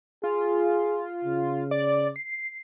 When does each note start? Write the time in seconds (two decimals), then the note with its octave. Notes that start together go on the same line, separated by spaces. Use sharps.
0.24 F4 G#4
1.24 C#3
1.71 D5
2.16 C7